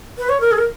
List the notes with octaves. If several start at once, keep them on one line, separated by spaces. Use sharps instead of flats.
B4
C#5
A#4
G#4
A#4